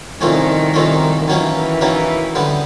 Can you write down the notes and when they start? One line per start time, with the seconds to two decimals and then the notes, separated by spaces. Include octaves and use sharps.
0.21 C2 A#2 D#3 F3 A3 C#4
0.74 C2 A#2 F3 A3 C#4
1.27 F#2 D#3 E3 F#3 A#3 C#4
1.81 F#2 D#3 F#3 A#3 C#4
2.35 F#2 D3 G3 B3